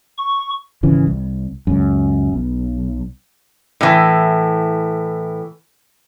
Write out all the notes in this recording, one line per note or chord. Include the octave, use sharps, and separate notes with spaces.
C#6
G#1 C#3 E3
C2
C#2 F#2
B1
A2 E3